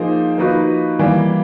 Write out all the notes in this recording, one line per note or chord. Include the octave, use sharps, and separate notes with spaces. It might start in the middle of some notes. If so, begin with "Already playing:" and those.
Already playing: F3 A#3 D#4 G#4 C5
F3 A#3 D#4 F#4 B4
E3 G3 A#3